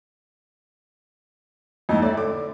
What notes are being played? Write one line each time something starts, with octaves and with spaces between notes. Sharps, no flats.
F2 A2 D#4
A2 D5 E5
D3 D6